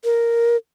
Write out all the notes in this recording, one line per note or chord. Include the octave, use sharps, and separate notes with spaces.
A#4